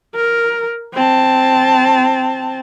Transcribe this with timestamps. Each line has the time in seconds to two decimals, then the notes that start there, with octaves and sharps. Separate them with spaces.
0.16 A#4
0.94 C4 A5